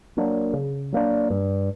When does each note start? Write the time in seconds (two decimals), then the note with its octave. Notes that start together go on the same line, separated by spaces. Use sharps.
0.17 F#3 A#3 D4
0.53 C#3
0.92 F#3 A#3 D4
1.30 G2